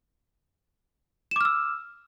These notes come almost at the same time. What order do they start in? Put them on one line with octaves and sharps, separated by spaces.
E7 D6 F6 E6